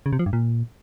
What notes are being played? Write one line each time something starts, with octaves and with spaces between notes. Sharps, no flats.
C#3
C3
F3
G2
A#2